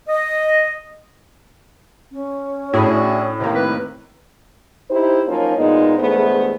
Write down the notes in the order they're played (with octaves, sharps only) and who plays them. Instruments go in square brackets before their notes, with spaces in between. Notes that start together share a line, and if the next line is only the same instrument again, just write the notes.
[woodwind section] D#5
[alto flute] C#4
[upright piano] A2 [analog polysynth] D4 E4 G#4 [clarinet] F#4
[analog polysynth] C3 D#3 A#3
[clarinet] B4
[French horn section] D#4 E4 G4 C5
F3 F#3 A#3 C#4 D#4
A#2 G#3 B3 D#4
E2 G2 G#3 A3 B3 C5